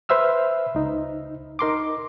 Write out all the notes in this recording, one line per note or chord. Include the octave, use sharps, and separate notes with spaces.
B4 C5 E5 E6 F6
C#2 D#4
D#4 A#4 C6 D6